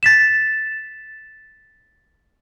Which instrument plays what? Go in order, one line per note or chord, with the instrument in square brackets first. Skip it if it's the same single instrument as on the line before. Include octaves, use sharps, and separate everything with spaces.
[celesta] A6 B6 E7